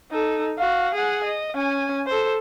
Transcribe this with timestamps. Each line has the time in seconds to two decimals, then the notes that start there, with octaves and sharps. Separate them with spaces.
0.11 D#4 A4
0.58 F#4 F5
0.95 G#4 F#5
1.25 D#5
1.55 C#4 G#5
2.07 A4 C5